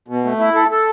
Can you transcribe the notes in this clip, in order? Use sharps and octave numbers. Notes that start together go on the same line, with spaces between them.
B2
A3
E4
A4
A4